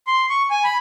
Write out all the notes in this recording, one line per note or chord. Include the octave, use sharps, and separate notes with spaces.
C6
C#6
G#5
B5